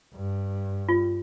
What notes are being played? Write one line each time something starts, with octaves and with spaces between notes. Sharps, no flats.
G2
F4